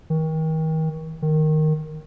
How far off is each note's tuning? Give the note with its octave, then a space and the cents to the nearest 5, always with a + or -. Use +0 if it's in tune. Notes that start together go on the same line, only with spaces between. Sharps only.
D#3 +35
D#3 -5